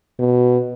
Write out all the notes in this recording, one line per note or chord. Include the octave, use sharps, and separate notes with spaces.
B2